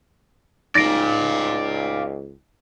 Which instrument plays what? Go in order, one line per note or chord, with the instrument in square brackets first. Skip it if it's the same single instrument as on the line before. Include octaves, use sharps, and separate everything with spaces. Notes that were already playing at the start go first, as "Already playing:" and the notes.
[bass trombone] C#2 [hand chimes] D#4 [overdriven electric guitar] D5 F5 [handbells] A6 A#6 D7